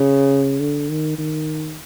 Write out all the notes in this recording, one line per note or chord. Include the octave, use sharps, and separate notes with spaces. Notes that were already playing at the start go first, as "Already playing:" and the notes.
Already playing: C#3
D3
D#3
D#3